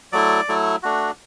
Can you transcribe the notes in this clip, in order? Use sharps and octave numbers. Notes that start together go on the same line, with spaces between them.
F#3 A3 E4 D5
F#3 A3 E4
A3 D4 F#4